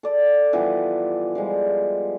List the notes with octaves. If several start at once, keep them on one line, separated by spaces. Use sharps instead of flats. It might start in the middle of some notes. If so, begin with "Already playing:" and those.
A4 D5
E3 F3 G3 B3
F3 G3 G#3